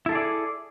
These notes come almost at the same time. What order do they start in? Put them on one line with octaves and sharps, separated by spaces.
E4 A4 G#4 D5